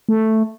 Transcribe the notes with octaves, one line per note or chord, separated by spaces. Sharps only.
A3